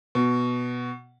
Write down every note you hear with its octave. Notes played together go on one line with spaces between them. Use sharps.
B2